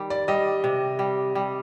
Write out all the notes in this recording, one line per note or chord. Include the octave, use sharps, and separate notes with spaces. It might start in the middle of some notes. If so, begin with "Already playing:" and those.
Already playing: D#3 G3
D5
G3 D#5
C3
G3
G3